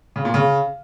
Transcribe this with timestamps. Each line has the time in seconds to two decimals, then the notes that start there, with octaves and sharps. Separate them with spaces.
0.16 C#3
0.25 A#2
0.34 C#3